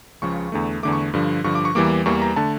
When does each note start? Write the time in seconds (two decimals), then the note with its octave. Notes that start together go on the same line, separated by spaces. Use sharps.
0.22 C#2 C#3 F3 C#6
0.52 E2 D3 A3
0.83 E2 D3 A3 D6
0.93 C#6
1.14 G2 D3 F3
1.44 G2 D3 F3 C#6
1.55 D6
1.65 C#6
1.75 E2 E3 G3 A#3 D6
2.06 E2 E3 G3 A#3 C#6
2.22 A#5
2.36 D3 A3 A5